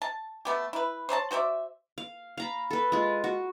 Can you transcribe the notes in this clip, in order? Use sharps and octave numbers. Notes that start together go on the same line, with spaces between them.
A5
A3 B3 G4
E4 B4
C5 C#5 D#5 A5
F#4 C5 D5 E5
F5
F5 A#5 B5
A4 B4
G#3 F4
F#4